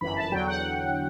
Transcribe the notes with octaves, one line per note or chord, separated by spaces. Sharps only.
G1 F#2 E3 B5
A5
E2 D3 F#3 G5
F#5